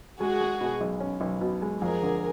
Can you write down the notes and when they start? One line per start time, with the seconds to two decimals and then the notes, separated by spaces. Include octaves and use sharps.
0.20 G#3 F#4 G#4
0.41 G#3
0.61 B2
0.81 B1
1.00 C#4
1.21 B1
1.41 B2
1.62 G#3
1.81 F2 G#4 A#4
2.02 D3